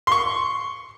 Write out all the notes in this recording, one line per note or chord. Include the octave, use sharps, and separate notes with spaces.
C6 C#6